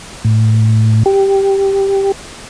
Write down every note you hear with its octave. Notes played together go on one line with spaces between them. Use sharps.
A2
G4